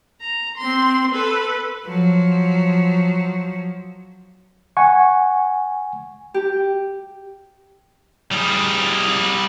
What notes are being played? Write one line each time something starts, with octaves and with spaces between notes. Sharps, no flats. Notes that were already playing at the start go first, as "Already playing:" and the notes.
A#5
C4 C6
A4 B4
F3 F#3
F#5 G#5 C#6
G4
G3 G#4